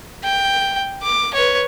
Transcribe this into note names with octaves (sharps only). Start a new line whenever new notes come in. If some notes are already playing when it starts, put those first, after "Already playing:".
G5
D6
B4 C#5